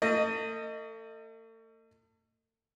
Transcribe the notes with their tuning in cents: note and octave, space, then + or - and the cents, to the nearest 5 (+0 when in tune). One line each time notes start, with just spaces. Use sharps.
A3 +40 D#5 +0